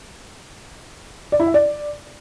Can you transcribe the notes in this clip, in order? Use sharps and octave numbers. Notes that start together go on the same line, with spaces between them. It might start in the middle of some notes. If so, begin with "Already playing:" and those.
D5
E4
E5
D5